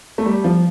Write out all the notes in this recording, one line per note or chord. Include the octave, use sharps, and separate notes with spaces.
A3
G3
F3